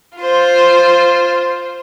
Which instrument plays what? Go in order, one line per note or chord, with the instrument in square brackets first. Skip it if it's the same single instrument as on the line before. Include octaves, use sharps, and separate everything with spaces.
[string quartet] F4 C5